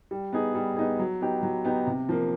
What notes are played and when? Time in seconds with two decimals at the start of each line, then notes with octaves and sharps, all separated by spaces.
0.11 G3
0.33 B3 D#4 G#4
0.55 G3
0.77 B3 D#4 G#4
0.99 F#3
1.21 B3 D#4 G4
1.43 F#3
1.65 B3 D#4 G4
1.87 C3
2.09 F3 A#3